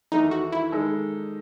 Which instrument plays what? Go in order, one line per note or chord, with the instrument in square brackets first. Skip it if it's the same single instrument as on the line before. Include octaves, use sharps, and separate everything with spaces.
[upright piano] E2 D#3 A3 [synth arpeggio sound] D#4
[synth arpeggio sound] F#4
E4
[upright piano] D#3 G#3 D#4 A4